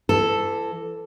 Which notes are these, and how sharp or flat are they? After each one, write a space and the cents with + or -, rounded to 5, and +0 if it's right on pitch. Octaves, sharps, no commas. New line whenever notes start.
E3 +30 A4 +0